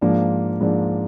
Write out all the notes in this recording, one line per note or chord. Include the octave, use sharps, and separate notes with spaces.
G#2 F3 A#3 D4
G#2 F3 A#3 D4